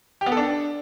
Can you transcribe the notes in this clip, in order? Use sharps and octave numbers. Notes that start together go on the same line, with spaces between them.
G4
B3
A4
D4